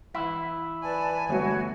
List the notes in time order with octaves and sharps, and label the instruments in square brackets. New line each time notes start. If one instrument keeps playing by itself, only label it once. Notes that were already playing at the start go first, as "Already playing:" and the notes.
[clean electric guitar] E3 E4 [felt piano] B6
[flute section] B4 D5 A5 [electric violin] G#5
[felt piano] G1 A3 B3 [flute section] F#4 C#5